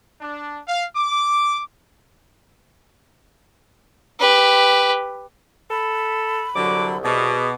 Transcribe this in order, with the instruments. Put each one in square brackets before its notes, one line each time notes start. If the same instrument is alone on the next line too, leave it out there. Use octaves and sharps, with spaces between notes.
[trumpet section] D4
F5
D6
[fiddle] G4 B4
[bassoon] A4 [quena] B5
[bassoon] C2 [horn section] D3 F#3 [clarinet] D6
[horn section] B2 [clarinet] G#4 [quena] D6